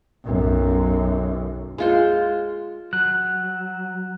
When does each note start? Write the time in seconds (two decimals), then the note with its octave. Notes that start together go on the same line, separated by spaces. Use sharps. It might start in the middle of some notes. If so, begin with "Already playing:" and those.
0.25 B1 F#2
1.78 G#3 F4 C5
2.93 F#3 F#6